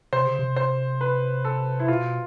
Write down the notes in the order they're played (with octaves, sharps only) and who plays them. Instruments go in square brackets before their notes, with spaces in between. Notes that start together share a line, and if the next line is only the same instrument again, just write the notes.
[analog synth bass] C3 [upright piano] C5
[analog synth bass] C#3
C3
[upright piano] C5
B4
A4
E4
[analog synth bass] B2 [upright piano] F4